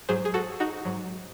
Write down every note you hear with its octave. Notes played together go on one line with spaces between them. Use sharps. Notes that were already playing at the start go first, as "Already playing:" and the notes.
G#2 F#3 G#4 C5
G#4
F#4 A4
D#4 F#4
G#2 F#3